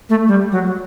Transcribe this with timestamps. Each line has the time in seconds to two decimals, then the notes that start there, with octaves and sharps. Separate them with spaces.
0.10 A3
0.28 G3
0.52 F#3